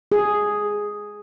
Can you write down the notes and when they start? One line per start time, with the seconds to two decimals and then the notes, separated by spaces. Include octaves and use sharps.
0.12 G#4